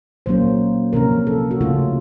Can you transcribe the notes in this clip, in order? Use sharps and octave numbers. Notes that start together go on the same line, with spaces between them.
A#2 F#3 A#3 C#4 C5
C3 F3 A#3 C#4 A#4
A4
F#4
C#3 A3 C#4 F4